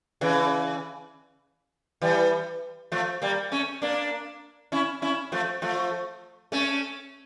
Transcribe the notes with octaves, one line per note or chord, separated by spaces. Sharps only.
C#3 E3
E3 G3
F3 A3
G3 A#3
A3 C#4
A#3 D4
C#4 E4
C#4 E4
F3 A3
F3 A3
A3 C#4